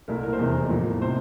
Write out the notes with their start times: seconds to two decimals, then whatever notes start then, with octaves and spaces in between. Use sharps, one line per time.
0.08 C2 A#2 A3 E4 A#4
0.23 A#4
0.33 C5
0.39 F1 E2 C3 A#4
0.70 A2 F3 A#3
1.02 C3 C5